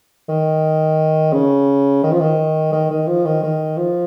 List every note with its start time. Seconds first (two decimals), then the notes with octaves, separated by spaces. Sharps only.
0.29 D#3
1.33 C#3
2.04 D#3
2.12 F3
2.20 D#3
2.73 D#3
2.91 D#3
3.07 F3
3.25 D#3
3.43 D#3
3.77 F3